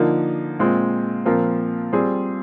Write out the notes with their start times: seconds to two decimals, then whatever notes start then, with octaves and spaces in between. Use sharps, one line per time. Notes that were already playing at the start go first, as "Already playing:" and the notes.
Already playing: D3 F3 A#3 D#4
0.59 A#2 G#3 C4 F4
1.25 A#2 F3 C4 F4 A#4
1.93 G3 C4 F4 G#4